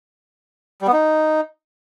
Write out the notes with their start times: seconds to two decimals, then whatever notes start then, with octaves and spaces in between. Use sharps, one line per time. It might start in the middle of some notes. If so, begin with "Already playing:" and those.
0.82 G3
0.87 B3
0.93 D#4